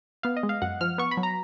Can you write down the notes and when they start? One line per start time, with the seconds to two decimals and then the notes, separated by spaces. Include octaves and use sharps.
0.23 B3 F5
0.37 D#5
0.43 G#3
0.49 F5
0.62 F#2 F#5
0.81 F3 F6
0.98 B3 C#6
1.11 B5
1.17 F#3
1.23 A#5